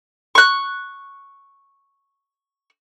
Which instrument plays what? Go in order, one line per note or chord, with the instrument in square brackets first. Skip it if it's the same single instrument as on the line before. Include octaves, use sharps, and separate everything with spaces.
[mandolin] C#6 F#6